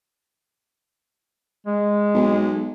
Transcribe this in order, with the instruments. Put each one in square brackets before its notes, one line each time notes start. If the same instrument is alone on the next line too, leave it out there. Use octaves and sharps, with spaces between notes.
[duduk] G#3
[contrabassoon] B1